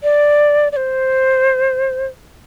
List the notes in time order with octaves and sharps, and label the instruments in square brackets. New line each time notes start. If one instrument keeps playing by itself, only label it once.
[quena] D5
D5
C5